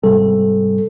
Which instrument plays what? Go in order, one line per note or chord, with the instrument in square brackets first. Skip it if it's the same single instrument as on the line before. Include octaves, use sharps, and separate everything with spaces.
[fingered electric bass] G#2 C3 G3 [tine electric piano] A4